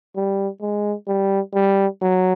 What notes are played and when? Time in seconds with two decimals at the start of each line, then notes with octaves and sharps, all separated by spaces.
0.16 G3
0.61 G#3
1.07 G3
1.54 G3
2.01 F#3